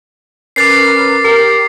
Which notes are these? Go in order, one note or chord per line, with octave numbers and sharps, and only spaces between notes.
C#4 A#4 B4 D6 A6 C7
G4 A#4